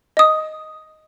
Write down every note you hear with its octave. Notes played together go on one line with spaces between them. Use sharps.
D#5 D#6